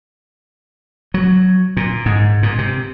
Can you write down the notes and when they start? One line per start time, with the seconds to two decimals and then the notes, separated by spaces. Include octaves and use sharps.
1.14 F#3
1.77 A#2
2.06 G#2
2.43 A#2
2.58 C3